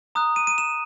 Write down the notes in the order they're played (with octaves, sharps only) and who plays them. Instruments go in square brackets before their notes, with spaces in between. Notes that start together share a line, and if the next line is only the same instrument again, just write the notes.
[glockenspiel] A#5 D#6 F#6
D#7
D#7
E7